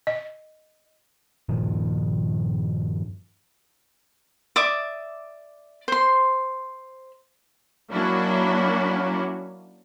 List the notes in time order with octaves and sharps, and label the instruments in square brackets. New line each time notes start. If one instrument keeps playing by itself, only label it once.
[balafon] D#5
[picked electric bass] G2 A#2 D#3 F3
[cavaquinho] D5 E5 D6 D#6
C5 C6
[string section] F#3 A#3 C#4 D4 E4 F#4